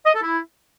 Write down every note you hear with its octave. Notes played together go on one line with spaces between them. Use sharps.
D#5
A4
E4